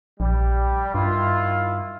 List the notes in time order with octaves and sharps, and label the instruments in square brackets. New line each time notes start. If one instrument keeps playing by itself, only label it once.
[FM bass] A#1 [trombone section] G3
[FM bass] G2 [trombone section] D#3 E4 F4